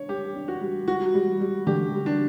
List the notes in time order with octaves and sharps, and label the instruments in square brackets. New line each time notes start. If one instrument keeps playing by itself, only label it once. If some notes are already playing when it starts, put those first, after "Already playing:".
Already playing: [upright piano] D4 [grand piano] C#5
[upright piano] G3 [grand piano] G4
[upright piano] D4
[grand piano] F#4
[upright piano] G3
[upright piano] G3 [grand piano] F#4
[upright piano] G3
G3
[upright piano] D3 [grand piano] G4
[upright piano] G3
[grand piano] D4